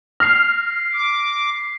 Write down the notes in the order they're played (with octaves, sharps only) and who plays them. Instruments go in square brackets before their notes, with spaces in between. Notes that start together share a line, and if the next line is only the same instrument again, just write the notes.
[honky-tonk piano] F6 [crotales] A#6 C7
[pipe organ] D6 [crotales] B6